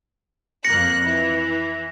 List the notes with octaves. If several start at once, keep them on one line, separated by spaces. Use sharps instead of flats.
F2 A#3 F#6 A#6 C#7
E3